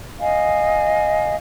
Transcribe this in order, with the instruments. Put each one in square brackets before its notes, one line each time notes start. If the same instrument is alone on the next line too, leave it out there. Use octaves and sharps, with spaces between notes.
[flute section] D#5 F5 G#5